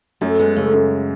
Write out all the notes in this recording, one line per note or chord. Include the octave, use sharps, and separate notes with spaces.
F#2 A3
G#3 B3
C#3 A3
F#2